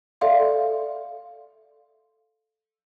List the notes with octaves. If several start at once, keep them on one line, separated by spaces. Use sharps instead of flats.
A4 D5 E5 F5 C6